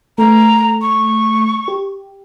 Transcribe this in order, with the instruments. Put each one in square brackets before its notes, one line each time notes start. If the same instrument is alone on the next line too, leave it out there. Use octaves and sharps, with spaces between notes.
[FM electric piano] A3 [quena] A#5
[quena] C#6
[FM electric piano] G4